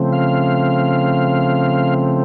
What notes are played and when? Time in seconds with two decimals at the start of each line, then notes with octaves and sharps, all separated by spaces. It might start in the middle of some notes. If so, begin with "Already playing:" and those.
Already playing: C#3 F3 A3 C4
0.12 F5